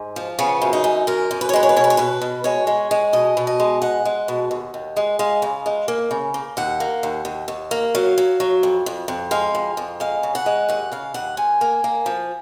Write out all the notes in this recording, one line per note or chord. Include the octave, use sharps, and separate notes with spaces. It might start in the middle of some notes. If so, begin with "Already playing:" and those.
Already playing: G#2
F3
C#3 B3
F#2
D#4
F#2
F#2 A#4
F#2
B4
C#5
G#3 B4
C#5
B4
B2 C#5
B4
C#5
B2 B4
B2
G#3 C#5
G#3
G#3
B2 D#5
B2
D#5
G#3
G#3 F#5
G#3
B2
D#2
D#2
G#3
G#3 F5
C#3
G#3
A#3
C#3
A#3
D#2 F#5
A#3
D#2
D#2
D#2
A#3
F#3 F5
F#3
F#3
F2
F2
F2
G#3 F5
F2
F2
G#3 F5
C#3
F#5
G#3
D#2 F#5
C#3 F5
D#2 F#5
G#2 G#5
A#3
A#3
F3